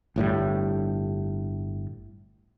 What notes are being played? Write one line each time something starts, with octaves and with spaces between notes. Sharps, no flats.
G1 A2 D3 G3